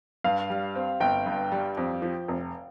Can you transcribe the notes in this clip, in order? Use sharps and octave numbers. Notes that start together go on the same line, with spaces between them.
G2 F5
G3
C4
G1 G5
G2
G3
F2
F3
F1